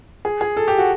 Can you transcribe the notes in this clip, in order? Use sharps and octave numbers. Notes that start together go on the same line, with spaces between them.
G#4
G#4
A4
G4
F#4